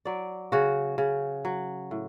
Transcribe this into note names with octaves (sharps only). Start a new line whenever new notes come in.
F#3 D5
C#3 F#4
C#3
F#3
A2